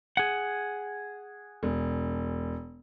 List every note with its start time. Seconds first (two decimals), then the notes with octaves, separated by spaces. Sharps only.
0.17 G#4 F#5
1.63 E1